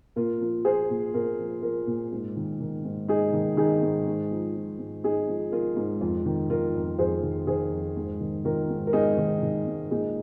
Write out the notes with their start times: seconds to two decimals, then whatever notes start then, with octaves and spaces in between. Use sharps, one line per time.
0.16 A#2 F4 A#4
0.41 F3
0.65 F3 G#4 C5
0.90 A#2
1.14 A#2 F4 A#4
1.39 F3
1.62 F3 F4 A#4
1.87 A#2
2.12 G#2
2.36 D#3
2.60 D#3
2.85 G#2
3.08 G#2 D#4 G#4
3.33 D#3
3.57 D#3 D#4 G#4
3.82 G#2
4.07 G#2
4.31 F3
4.56 F3
4.79 G#2
5.04 G#2 D#4 G#4
5.28 F3
5.52 F3 F4 A#4
5.76 G#2
6.01 F2 F4
6.25 D#3
6.50 D#3 F4 A#4
6.75 F2
6.98 F2 G#4 C5
7.23 D#3
7.47 D#3 G#4 C5
7.72 F2
7.96 G#2
8.20 D#3
8.45 D#3 F4 A#4
8.70 G#2
8.87 A#4
8.93 G#2 D#4 G#4
9.18 D#3
9.43 D#3
9.67 G#2
9.91 A#2 D#4 G#4